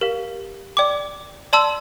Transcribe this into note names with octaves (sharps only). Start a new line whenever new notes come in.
G4 A#4 F5
D5 G5 D6
D5 A5 C6 E6